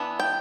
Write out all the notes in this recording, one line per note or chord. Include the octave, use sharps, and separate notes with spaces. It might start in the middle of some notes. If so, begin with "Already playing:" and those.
Already playing: E3 B3 D4
G5